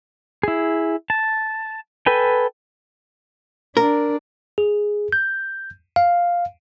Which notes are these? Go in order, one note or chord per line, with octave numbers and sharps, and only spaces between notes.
E4 G#4
A5
A4 B4 G5 G#5
D4 A#4
G#4
G6
F5